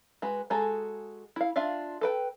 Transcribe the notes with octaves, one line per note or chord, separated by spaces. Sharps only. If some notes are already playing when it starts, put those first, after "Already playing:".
G#3 F#4 B4
G#3 F#4 G#4 A4 A#5
E4 F5
D4 F4 E5 F5
A4 B4 G5